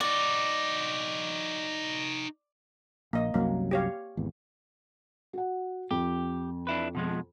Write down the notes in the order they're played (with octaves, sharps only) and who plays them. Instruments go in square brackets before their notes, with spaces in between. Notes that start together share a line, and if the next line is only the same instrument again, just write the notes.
[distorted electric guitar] D#4 F#4 [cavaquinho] D5
[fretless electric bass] A#1 [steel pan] A#3 D#5
[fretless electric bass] C2 F#2 F#3 [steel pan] A#3
[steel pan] G4 C#5 F5
[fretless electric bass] G#1 E2
[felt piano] F#4 F#5
[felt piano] F2 [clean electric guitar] G4
[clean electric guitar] D4 E4 B4
B2 F3 G#3